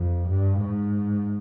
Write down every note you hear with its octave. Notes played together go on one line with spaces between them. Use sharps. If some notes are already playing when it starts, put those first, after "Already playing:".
Already playing: F2
G2
G#2